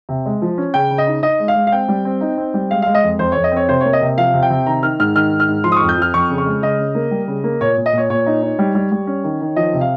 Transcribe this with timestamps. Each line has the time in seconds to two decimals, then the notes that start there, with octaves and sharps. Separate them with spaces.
0.09 C3
0.26 G#3
0.42 F3
0.58 C#4
0.74 C#3 G5
0.90 C#3
0.98 D#5
1.07 D#4
1.23 D#4 D#5
1.40 G#3
1.48 F5
1.55 G#3
1.67 F5
1.72 C4 G5
1.89 G3
2.05 C4
2.21 D#4
2.37 C4
2.54 G3
2.70 G#3 F5
2.82 G#3 F5
2.95 D#5
3.04 F2
3.19 F2 C5
3.32 F2 C#5
3.44 D#5
3.52 C4 C#5
3.69 C3 C5
3.81 A#3 C#5
3.93 D#5
4.01 C3
4.18 F3 F5
4.34 C3
4.43 G5
4.50 C3
4.66 D#3 A#5
4.83 D#3 F6
4.99 G#2 F6
5.15 D#3 F6
5.32 G#2
5.40 F6
5.49 G#2
5.64 F3 C6
5.72 D#6
5.77 F2 C#6
5.89 G6
5.97 F3 F6
6.14 F2 C#6
6.30 C#3
6.38 C#6
6.46 G#3
6.62 C#3 D#5
6.79 C#3
6.95 A#3
7.11 G3
7.28 C#3
7.44 A#3
7.61 A#2 C#5
7.78 A#2
7.86 D#5
7.93 A#2 C#5
8.10 A#2 C#5
8.26 D#4
8.42 D#4
8.59 G3
8.75 G3
8.92 G3
9.07 C#4
9.24 D#3
9.41 D#3
9.56 F3 D#5
9.73 C3
9.81 F5